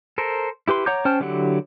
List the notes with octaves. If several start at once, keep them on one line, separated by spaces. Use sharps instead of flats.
A4 A#4 C5
E4 G4 B4 C6
C#5 F#5 A#5 D6 G6
C#4 C5 G5 A5 F6
D3 F#3 E4 G4 F#5